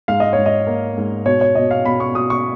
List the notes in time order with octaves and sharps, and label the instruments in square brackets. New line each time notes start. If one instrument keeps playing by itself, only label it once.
[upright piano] G#2 F5
D#5
C#5
G#2
D#5
A#3
G#2
B2 C#5
C#5
B2 D#5
F5
B2 B5
C#6
B2 D#6
C#6